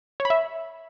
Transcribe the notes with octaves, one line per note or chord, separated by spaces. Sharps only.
C#5
B5
E5